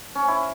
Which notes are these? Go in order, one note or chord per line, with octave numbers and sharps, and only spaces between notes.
C#4
E4